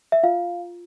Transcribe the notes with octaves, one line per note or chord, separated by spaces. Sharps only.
E5
F4 F5